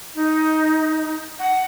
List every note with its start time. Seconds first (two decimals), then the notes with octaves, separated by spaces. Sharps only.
0.15 D#4
1.39 F#5